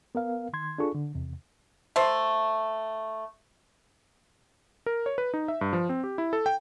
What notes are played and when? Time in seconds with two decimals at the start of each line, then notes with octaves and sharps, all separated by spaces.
0.15 B3 A#4 F5
0.53 D#3 C6 G#6
0.78 D4 F4 G#4 A4 C#6
0.95 D3
1.15 E2 C3
1.96 A3 C5
4.86 A#4
5.06 C#5
5.18 B4
5.34 D#4
5.48 E5
5.61 G2
5.73 F3
5.89 C4
6.04 G4
6.18 E4
6.33 A4
6.46 G5